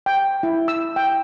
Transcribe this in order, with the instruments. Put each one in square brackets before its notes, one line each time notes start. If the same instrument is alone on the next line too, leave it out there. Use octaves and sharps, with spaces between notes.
[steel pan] G5
E4
E6
G5